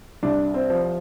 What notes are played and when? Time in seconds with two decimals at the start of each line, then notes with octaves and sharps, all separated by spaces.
0.23 C2 D4
0.54 C4
0.70 F3